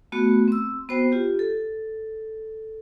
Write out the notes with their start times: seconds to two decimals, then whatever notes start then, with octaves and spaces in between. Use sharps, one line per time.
0.12 A3 B3 F#4
0.48 C4 E6
0.89 B3 F#4 C5 G5
1.12 F4 G4
1.39 A4